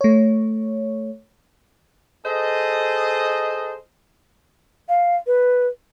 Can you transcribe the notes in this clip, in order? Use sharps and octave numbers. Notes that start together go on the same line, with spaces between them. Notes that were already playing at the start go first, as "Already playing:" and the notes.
A3 C#5
G#4 A4 C5 D#5
F5
B4